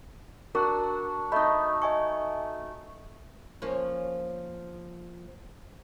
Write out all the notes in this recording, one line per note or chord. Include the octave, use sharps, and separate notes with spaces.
D4 F#4 A#4 F#5
A3 D#4 D#5 B5
D#5 G#5 C#6
F3 A#3 C#4